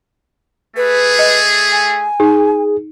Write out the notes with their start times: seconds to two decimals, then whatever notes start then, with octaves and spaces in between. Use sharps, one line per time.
0.77 A3 G#4 B4
1.19 D#5
1.72 G#5
2.20 D#4 G#4